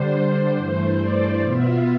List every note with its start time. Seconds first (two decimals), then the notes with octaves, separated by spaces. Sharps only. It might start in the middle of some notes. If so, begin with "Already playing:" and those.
Already playing: D3 G3 D4 C5
0.12 C5
0.55 G2 E3 A3 C5
0.98 D5
1.42 B2 B3 F4 E5